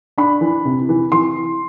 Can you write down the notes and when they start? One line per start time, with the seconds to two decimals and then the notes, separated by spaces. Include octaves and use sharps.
0.18 D4 B5
0.41 E3
0.65 C3
0.89 E3
1.12 E3 C6